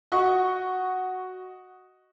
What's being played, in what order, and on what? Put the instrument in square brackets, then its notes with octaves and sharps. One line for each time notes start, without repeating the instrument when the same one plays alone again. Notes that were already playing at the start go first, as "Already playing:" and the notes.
[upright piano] F#4 D#5 C#6